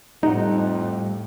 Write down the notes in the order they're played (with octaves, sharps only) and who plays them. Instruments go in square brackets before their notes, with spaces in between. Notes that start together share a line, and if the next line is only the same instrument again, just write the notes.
[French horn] F2 [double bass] A2 [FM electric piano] G3 F#5 [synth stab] D#4